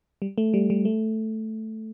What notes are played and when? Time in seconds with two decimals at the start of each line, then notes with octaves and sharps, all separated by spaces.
0.22 G3
0.38 A3
0.54 G3
0.70 G3
0.85 A3